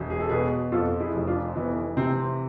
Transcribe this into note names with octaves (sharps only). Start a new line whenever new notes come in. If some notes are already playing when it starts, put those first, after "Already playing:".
Already playing: E1
G#4
A4
B2 G#4 B4
F2 F4 A4
E4 G#4
F1
D4 F4
E3 B3
C3 C4